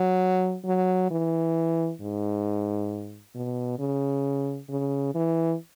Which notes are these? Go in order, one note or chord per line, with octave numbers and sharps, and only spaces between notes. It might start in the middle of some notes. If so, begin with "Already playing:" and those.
Already playing: F#3
F#3
E3
G#2
B2
C#3
C#3
E3